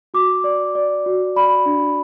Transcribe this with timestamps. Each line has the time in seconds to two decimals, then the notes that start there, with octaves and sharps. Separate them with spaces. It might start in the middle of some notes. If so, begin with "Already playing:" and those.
0.14 F#4 D6
0.44 D5
0.75 D5
1.06 F#4
1.36 D5 B5
1.66 D4